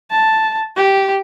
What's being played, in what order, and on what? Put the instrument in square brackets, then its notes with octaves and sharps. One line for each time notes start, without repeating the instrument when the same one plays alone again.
[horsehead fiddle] A5
G4